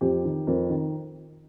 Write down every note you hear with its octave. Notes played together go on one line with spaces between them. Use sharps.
F2 G4
D#3
F2 A#4
D#3